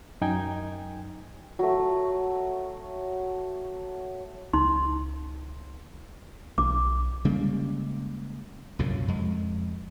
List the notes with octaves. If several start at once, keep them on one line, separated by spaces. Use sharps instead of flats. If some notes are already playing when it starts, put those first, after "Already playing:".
F#2 D#4 G5 G#5 G#6
F#3 A3
C#2 D#4 C6
B1 D6
C#3 G3 G#3 A#3
C2 F#2 A#2 C#3
F2 G#3